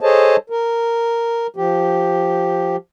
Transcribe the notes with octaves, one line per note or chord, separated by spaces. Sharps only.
G#4 A4 C5 C#5 D#5 A5
A#4
F3 G4